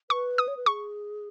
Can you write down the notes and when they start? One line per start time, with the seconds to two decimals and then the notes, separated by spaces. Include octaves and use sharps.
0.10 B4 C#6
0.38 D#6
0.48 C#5
0.57 B4
0.66 G#4 C#6